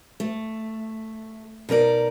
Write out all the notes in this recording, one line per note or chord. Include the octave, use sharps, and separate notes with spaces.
A3
B2 D#4 A#4 D5